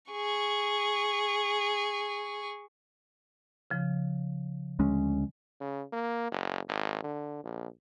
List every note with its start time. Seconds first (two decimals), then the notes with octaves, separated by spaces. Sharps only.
0.12 G#4 C#6
3.70 C#3 F3
4.79 D2 G#3 C#4
5.61 C#3
5.93 A#3
6.32 F#1
6.69 G#1
7.04 D3
7.44 A#1